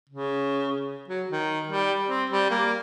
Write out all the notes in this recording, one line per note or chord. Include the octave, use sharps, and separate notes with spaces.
C#3
F#3
D#3
G3
C4
G3
A#3